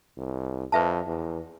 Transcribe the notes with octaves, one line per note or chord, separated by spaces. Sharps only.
C2
F2 B4 E5 A5
E2